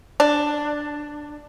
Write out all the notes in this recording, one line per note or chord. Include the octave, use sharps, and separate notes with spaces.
D4